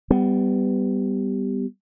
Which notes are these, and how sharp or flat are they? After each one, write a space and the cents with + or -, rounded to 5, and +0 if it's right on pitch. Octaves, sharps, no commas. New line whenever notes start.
G3 +0 B3 +20